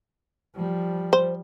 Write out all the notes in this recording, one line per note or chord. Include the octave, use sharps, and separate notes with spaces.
F3 G3
C5